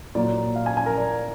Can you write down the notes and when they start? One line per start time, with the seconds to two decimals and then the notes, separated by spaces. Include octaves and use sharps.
0.15 A#2 F#3 A#3 D5
0.56 F5
0.66 G#5
0.77 G#5
0.86 A#4
0.97 D5